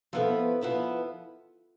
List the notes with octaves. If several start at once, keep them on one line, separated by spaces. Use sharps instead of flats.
F3 B3 E4 F4 A4 B4
F3 B3 E4 B4